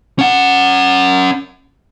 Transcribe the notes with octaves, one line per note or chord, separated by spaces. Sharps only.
C#4 F#5